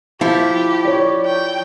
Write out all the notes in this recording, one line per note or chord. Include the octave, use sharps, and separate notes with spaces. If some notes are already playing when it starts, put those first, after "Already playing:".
F3 E4 G4
C#5 D5
G5